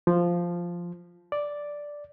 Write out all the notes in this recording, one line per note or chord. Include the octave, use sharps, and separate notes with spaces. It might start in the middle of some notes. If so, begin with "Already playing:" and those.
F3
D5